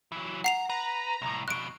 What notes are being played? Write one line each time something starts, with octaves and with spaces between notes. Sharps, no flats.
E3 F#3
F#5 A#5 C7 F7
B4 A#5
C2 A2
F2 B2 F#6 D7